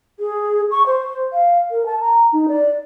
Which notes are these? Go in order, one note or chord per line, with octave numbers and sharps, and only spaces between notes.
G#4
C#6
C5
F5
A#4
A5
A#5
D#4
D5